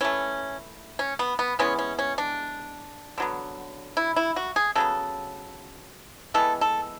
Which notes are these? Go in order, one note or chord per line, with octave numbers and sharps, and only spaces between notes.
E3 A3 C#4
C#4
B3
B3
E3 G#3 B3 C#4
C#4
C#4
D4
D3 F#3 B3
E4
E4
F#4
G#4
C#3 F#3 B3 A4
E3 G#3 B3 A4
A4